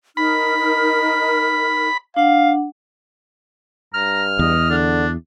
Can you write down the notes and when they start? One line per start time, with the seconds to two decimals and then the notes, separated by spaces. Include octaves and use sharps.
0.17 D#4 A#4 B5 F6
2.16 D4 F5 F#5
3.94 G2 A#5 F6
4.39 E2 D#5
4.70 D3 D4